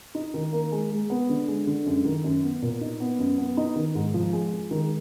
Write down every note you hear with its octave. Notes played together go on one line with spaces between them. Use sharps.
D#4
D#3
A#3
G#3
G#3
B3
D3
G#3
D3
F#2
D#3
F#2
B3
A#2
D#4
B3
F#2
B3
D#4
D#3
G#2
F3
G#3
G#3
D#3